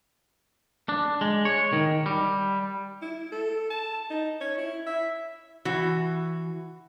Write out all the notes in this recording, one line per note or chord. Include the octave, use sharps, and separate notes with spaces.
D4
G#3
C#5
D#3
G3
E4
A4
A5
D#4
C#5
E4
E5
E3 F#4